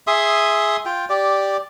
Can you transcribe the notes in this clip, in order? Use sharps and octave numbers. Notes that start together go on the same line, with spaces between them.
G#4 E5 C6 D#6
F4 G5
G4 D5